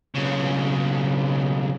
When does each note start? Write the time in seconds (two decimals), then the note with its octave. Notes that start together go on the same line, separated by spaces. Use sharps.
0.15 B1 C#3